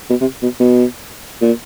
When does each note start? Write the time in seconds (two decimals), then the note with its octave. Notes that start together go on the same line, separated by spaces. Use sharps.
0.10 B2
0.21 C3
0.43 B2
0.60 B2
1.42 A#2